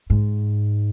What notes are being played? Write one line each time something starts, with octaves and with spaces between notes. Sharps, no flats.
G#2